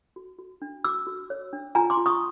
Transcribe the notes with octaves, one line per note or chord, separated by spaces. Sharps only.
F#4
F#4
D4
F#4 D6 E6
F#4
C#5
D4
F4 G#5 A#5
C6 D6
F4
C#6 D#6